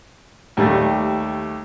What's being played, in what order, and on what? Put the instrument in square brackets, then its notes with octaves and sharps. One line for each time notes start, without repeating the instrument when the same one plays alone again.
[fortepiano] D#2 G3 A3